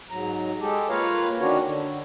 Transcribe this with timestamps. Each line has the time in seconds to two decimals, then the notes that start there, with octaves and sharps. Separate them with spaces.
0.11 G#2 F#3 A#5
0.60 G#3 G4 A4
0.90 A#3 F4 B4 C#5 F5 A#5
1.40 D3 D#3 C#4 D4 F#4 C#5
1.64 D3